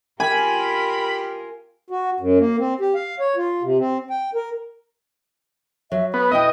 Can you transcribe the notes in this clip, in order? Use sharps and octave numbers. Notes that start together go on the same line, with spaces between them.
F4 G4 A#4 G#5 B5
F#4
F#2
A#3
C4
G4
F5
C#5
F4
C3
C4
G5
A#4
F#3 E5
B3 B4
B2 E4 D#5 G5